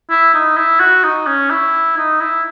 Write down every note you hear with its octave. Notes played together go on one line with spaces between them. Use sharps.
E4
D#4
E4
F#4
D#4
C#4
E4
D#4
E4